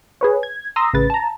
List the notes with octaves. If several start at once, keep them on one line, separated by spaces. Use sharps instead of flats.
G#4 B4 C#5
G#6
A#5 C6 D#6 E6 A#6
A1 C#3 B4 A6
A5 A#5